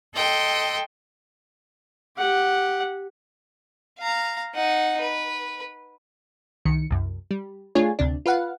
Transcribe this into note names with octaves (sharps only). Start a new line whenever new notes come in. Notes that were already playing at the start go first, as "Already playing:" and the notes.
A4 D#5 G5 C6
G4 F#5
F5 A#5
D#4 F#5
B4
C2 D#3 C#7
C2 F#2
G3
A3 D4 F4 G#4 C#5 G#5
D2 C3 D4
F4 B4 F5 F#5